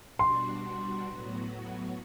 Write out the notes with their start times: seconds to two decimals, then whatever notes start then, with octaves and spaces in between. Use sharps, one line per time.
0.19 B2 G3 D4 F#4 C6
1.07 A2 F#3 B3 F#4